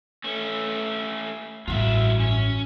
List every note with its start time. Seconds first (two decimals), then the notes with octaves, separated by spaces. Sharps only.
0.24 A3 C#4
1.68 A1 G2 F4 F#4 E5
2.20 C#4